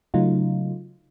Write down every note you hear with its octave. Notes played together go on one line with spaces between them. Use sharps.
C#3 F#3 A3 D#4 F4